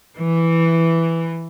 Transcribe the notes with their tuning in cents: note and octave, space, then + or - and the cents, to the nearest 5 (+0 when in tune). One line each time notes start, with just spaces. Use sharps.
E3 +5